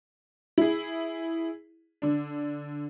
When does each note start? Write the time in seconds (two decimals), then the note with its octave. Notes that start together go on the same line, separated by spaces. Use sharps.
0.58 E4 G#4
2.02 D3 D4